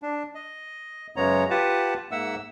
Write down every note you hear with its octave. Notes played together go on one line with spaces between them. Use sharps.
D4
D#5
F#2 C#3 G#3 B3 C#5 A#5
F4 G4 B4 F#5 A5
G#2 A#3 E5 F#5 E6